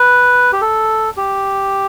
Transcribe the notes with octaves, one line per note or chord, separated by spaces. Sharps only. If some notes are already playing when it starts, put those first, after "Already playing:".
Already playing: B4
G4
A4
G4